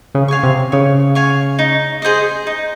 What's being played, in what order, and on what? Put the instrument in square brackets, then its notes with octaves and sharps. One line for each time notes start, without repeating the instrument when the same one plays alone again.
[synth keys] C#3
[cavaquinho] F5 G#5 C#6
[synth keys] C3
[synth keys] C#3 [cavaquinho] C#5
[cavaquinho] F5 G#5 C#6
D#4
G#4 C5 D#5
D#4